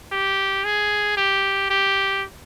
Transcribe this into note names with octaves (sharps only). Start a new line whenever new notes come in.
G4
G#4
G4
G4